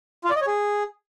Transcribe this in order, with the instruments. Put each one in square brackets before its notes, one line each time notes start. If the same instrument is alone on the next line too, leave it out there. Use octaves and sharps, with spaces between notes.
[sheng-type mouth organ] F4
D5
D#5
C#5
G#4